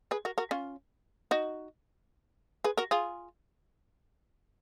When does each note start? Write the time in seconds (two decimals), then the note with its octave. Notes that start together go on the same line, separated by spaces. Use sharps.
0.11 G#4 B4
0.25 F#4 A#4
0.38 F#4 A#4
0.51 C#4 F4
1.31 D#4 F#4
2.64 G#4 B4
2.77 F#4 A#4
2.91 F4 G#4